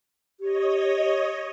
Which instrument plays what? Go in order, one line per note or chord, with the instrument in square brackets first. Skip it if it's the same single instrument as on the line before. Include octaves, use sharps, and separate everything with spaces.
[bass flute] G4 [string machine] C#5 D#5